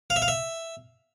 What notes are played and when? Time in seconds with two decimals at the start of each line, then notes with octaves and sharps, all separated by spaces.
0.10 F5
0.16 E5
0.22 F5
0.28 E5